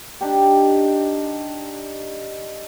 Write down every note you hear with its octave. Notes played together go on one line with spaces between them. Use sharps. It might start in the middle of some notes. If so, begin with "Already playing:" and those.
D4 D#4 G4